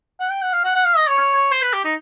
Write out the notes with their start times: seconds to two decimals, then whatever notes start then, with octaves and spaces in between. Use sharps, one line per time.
0.20 F#5
0.31 G5
0.42 F#5
0.53 F5
0.64 F#5
0.75 F#5
0.86 F5
0.97 D#5
1.08 C#5
1.18 C#5
1.35 C#5
1.51 C5
1.62 B4
1.73 G4
1.85 D#4